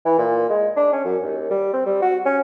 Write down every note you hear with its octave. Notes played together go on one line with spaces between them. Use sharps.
E3
A#2
G#3
D4
C#4
F#2
D#2
G3
C4
G3
F#4
C#4